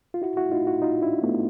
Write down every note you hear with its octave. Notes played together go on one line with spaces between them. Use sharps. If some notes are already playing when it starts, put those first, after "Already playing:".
F4
E4 F#4
E4 F#4
D#4 F4
E4 F#4
D#4 F4
D4 E4
A3 B3